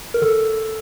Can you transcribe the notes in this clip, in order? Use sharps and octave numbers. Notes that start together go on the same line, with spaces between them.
A#4
D#3 A4